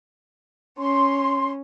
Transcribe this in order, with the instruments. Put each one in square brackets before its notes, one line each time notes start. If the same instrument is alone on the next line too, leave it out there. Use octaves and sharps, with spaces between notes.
[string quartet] C#4 [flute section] C6